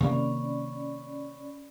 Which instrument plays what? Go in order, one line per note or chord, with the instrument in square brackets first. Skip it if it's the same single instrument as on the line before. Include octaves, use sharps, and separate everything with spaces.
[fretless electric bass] C3 D#3 A#3 [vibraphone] C#4 D5 B5